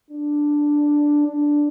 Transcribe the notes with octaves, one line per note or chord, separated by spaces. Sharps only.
D4
D4